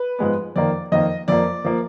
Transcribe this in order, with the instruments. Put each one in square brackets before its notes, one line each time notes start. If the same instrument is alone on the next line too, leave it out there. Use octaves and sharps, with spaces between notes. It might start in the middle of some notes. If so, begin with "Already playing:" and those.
Already playing: [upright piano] B4
G#2 F3 G#3 B3
F2 D#3 A#3 D5
F2 D#3 A#3 D#5
F2 F3 A#3 D5
F3 A#3